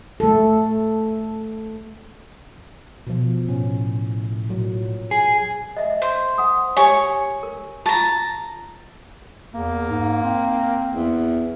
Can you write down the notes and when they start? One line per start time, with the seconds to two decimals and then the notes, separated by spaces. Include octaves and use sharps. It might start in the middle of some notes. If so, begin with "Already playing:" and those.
0.20 A3 A4
3.07 B2 F3
3.48 A2 C#4
4.50 A#2 F#3
5.11 G#4
5.77 D#5 E5
6.02 C5
6.38 F#5 D#6
6.77 G4 C#5 G#5 C#6
7.43 A#4
7.86 F4 A5 A#5 C#6
9.54 E2 A#3
9.90 G#2
10.24 C4
10.92 E2